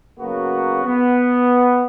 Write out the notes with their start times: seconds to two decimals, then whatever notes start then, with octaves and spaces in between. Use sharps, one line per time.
0.20 C#3 F#3 A#3 B3 F#4
0.85 B3